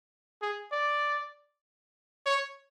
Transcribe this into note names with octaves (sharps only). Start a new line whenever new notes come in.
G#4
D5
C#5